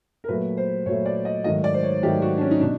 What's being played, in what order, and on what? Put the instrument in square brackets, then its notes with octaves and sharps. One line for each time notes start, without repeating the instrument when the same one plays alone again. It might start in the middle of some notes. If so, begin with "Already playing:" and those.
[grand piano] A#4
A#2 F#3 A3 B4
C5
A#2 C#5
F#3 A3
D5
D#5
G#2 D#3 F#3 A3 D#5
D5
C5
C#5
G#2 D#3 F#3 A3 G4
F#4
D4
C#4
D#4
B2 D4